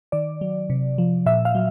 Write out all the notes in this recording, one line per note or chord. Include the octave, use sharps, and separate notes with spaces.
D#3 D5
F#3
C3
F3
A#2 E5
F5
F#3